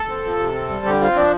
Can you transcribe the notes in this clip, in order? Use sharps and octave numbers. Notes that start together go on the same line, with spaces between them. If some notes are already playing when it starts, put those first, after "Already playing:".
Already playing: A4
C4
F3
C3
C4
G3
D3 G4
C4 F4
F3 D4